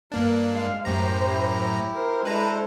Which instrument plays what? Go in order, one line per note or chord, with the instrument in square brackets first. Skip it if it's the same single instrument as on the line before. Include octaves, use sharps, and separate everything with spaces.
[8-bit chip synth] G2 A#3 D4 [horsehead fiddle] A#4
[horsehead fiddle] G#3 F5
[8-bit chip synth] F#2 A2 A#5 [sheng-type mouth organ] G4 [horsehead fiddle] C5
[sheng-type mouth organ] E4 G4
[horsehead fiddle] A#4 C5
[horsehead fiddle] G#3 A4 [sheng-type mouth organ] D4 E4 C5 [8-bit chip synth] B4 A#5